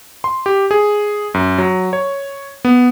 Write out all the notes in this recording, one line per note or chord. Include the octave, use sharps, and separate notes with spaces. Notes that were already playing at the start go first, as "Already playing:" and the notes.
C6
G4
G#4
F#2
F#3
C#5
B3